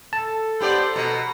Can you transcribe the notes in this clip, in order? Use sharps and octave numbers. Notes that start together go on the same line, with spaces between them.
A4 A5
B3 G4 C5 D5
B2 A#5